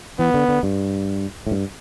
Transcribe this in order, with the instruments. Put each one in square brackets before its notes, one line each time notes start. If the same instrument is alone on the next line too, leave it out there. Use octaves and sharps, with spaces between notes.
[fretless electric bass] E3 [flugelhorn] B3
[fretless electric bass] D3
D3
G2
A2
G2